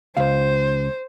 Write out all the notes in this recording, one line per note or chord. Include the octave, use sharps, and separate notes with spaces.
C#2 C5 F5